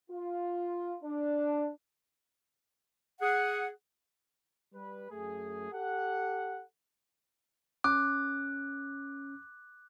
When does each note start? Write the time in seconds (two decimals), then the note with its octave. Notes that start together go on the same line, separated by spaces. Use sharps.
0.11 F4
1.03 D4
3.21 G#4 F#5
4.74 G3 B4
5.11 F#2 A3 G#4
5.72 G4 A4 F#5
7.84 C#4 D6 F#6